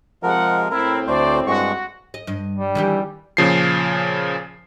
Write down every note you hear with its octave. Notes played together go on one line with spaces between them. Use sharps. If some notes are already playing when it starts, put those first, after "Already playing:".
C3 F3 G#3 A#4 F#5
A2 C4 E4 A#4
D2 A3 C5 D5
G2 G#3 F#4 C#6
D#5
G2 D#5
G3
D#3 E3 G4
A#2 C#3 F3 C7